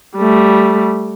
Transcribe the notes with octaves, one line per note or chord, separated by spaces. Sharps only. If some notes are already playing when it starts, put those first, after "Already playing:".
G3 A3